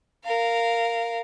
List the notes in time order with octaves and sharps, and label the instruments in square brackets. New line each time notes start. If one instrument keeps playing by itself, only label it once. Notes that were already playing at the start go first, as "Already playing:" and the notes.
[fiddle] A#4 F5